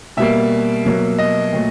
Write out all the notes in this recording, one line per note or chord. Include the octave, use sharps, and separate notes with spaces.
B2 G3 A#3 E5
B2 F#3 A#3
D#5
A#2 F#3 A3